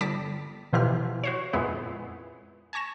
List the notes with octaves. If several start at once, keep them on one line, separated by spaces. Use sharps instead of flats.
G1 G3 A5 D6 A#6 B6
B2 E3 F3 E4 G4 F6
F#4 C5 C#5
F2 A#2 G#3 B3 E4
G#5 A5 C#6 A#6 E7